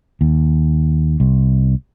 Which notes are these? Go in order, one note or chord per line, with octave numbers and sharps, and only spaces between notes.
D#2
C2